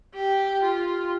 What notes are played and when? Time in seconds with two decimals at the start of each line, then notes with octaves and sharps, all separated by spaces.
0.14 G4
0.63 F4